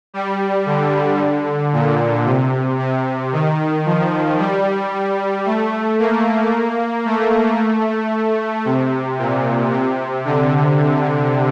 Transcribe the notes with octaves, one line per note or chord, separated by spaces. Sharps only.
G3
D3
A#2
C3
C3
D#3
F3
G3
A3
A#3
A3
C3
A#2
C3
D3